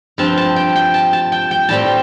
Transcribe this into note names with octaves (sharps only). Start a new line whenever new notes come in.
G2 F3 C4 A5
A5
G5
G5
A5
A5
G5
G5
A2 G3 C4 A5